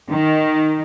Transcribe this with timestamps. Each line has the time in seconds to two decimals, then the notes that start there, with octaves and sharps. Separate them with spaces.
0.10 D#3